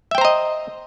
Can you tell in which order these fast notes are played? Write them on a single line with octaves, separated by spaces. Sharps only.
E5 G5 C5 A#5 D#5